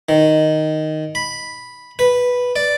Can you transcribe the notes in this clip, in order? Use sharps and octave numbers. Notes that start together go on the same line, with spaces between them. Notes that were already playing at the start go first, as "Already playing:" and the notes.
D#3
B5
B4
D5